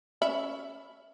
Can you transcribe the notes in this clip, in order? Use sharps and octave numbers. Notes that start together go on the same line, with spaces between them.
C#4 E5 B5